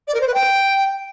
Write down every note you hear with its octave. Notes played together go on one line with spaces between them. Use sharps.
D5
A#4
C5
B4
G5